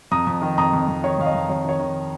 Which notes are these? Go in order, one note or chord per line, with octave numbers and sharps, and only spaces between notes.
F2 A#5 D#6
F2
D#3
F2 A#5 D#6
F2
F2
D#3 C#5
F2 F5
D#5
F2
F2 C#5
D#3 C#5
D#3